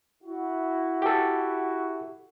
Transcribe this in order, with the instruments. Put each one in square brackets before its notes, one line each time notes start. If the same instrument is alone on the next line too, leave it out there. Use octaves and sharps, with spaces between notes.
[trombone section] E4 F#4
[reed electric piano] G4 A4